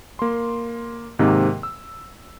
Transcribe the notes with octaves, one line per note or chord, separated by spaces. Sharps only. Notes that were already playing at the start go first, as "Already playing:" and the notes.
A#3 C6
G#2 C3 D#3 A#3
E6